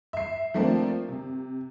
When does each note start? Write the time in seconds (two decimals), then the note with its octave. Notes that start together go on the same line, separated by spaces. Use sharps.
0.13 E5 C7
0.54 F3 A3 A#3 C4 D4
1.09 C3